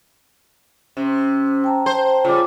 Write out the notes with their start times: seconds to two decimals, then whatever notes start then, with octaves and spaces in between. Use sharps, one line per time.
0.97 C3 C#4
1.64 G5 A5 A#5
1.86 C5
2.25 C#3 G3 F4 D6